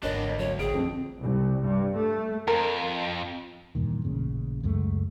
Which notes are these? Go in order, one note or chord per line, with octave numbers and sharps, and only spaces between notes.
G#1 E2 D3 B3 D4 A#4 C#5 D#5
D2
F#3 C#5
A1 G#4 G5 D7
F2 D#3 A3 C4
C2
G2
A3
F2 A#4
E2 G2 A#2 D#3
A1 A#2 C#3
C#2 F#2 G#3 A3